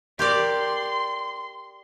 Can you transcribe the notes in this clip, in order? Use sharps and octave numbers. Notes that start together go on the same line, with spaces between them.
G4 A#4 D5 C6